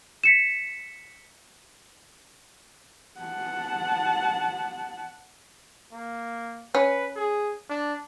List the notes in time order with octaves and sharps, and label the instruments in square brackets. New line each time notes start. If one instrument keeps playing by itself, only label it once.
[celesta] B6 C#7 E7
[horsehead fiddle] F#5 A5
[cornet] A#3
[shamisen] C#4 [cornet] B4
[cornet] G#4
D4